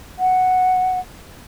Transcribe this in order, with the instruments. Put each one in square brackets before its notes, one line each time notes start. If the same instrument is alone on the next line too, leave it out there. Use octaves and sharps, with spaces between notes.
[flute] F#5